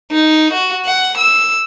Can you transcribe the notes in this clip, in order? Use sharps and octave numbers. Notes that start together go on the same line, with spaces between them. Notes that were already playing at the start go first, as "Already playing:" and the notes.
D#4
F#4
F#5
E6